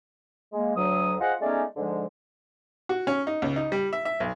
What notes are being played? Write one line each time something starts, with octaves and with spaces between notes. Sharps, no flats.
G#3 A#3
D2 F#3 D#6
F4 G#4 C5 D#5 F#5
G#3 A3 B3 C#4 D#4 D5
G#2 D3 F3 G#3
F#4
C#4
D#4
C#2
D#4
G3
E5
E5
B1